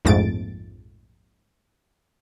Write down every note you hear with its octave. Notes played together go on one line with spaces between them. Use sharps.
A#1 F2 G#2 A3 A6 D7